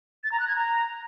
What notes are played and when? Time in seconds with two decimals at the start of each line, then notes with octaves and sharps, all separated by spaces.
0.24 A6
0.32 A#5
0.40 F#6
0.48 G#6
0.56 A#5